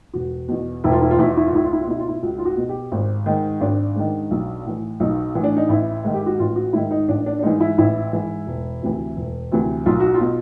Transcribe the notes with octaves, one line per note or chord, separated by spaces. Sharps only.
E1 F#4
E2 B2
E1 E4
F4
E4
F4
E2 B2 E4
F4
E4
F4
C#2 E4
F4
E4
F4
B2 E4
F4
E4
C#2 F#4
F4
F#4
B2
G4
G#1
G#2 D#3
G#1 D4
G#2 D#3
B1
A2 E3
B1 D#4
A2 E3
D4
D#4
A1 E4
G#2 D#3
G4
F#4
A1 F4
F#4
G#2 D#3 E4
D#4
A1 D4
D4
D4
G#2 E3 D#4
E4
A1 E4
G#2 E3
E1
D2 C3 E3
E1
D2 C3 E3
B1 F4
F#4
F4
B2